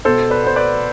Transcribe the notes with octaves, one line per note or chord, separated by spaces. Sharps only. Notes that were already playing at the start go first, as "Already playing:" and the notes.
B2 A4 C5
B4 D5
B3 C5
B4 D5